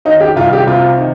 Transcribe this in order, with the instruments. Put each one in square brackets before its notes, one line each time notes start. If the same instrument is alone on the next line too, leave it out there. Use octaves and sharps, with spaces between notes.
[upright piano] D#3 D#4
G4
C2 F4
G4
C3 F4
D#3